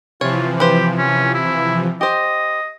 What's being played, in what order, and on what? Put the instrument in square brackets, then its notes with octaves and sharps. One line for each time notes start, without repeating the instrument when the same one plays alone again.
[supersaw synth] C3 E3 F3 [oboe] F4 [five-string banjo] C#5
[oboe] G4 [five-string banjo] B4 C5
[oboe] C#4
E4
[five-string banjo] G4 C5 [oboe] D#5